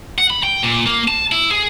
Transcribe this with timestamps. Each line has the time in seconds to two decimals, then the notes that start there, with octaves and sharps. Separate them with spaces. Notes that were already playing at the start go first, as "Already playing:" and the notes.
0.18 F#5
0.30 B5
0.43 G5
0.63 A#2
0.86 A#3
1.08 A5
1.32 E4
1.51 G#4